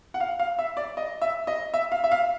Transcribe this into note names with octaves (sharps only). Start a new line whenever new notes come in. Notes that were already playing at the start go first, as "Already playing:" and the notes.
F#5
F5
F5
E5
D5
D#5
E5
D#5
E5
F5
E5
F5